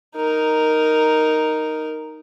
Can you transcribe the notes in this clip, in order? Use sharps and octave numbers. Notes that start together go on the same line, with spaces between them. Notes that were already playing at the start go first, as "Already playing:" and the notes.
D#4 A#4